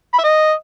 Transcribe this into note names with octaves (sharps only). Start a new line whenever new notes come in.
B5
E5
D#5